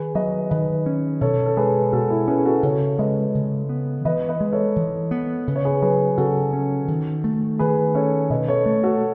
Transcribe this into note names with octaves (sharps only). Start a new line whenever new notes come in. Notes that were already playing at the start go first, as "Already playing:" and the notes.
Already playing: D#3 G#4 B4
F#3 B4 D#5
D#3 B4 D#5
C#4
B2 A4 C#5
A4
G#3 G#4 B4
B2 F#4 A4
E4 G#4
C#4 G#4 B4
F#4 A4
C#3 A4 C#5
G#3 B4 D#5
C#3
B3
E3 B4 D#5
B4 D#5
G#3
A4 C#5
E3
B3
C#3 B4
C#5
G#4 B4
F#3 G#4 B4
C#3 F#4 A4
C#4
D#3
A3
D#3 G#4 B4
C#4 A4 C#5
B2 B4 D#5
A4 C#5
A3
F#4 A4